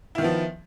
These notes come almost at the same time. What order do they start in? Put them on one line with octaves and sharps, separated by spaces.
E4 D#3 B3 F3